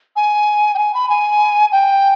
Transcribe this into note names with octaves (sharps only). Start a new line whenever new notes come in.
G#5
G5
G#5
B5
G#5
G5